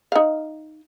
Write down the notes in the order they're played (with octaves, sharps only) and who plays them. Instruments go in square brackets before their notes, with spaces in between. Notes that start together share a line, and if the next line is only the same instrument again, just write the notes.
[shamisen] D#4 F5